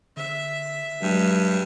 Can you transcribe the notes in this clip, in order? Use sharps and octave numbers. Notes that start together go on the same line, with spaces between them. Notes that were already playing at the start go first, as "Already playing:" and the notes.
D3 E5
G2 F#3 G#3